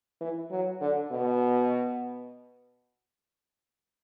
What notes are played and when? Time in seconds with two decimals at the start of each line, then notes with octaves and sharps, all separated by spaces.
0.21 E3
0.51 F#3
0.82 D3
1.11 B2